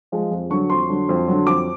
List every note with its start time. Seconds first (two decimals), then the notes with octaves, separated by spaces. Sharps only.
0.12 F3 G#3
0.31 F2
0.50 D3 F#3 C#6
0.70 F2 C6
0.89 D3 F#3
1.09 F2
1.28 D3 F#3
1.46 F2 D6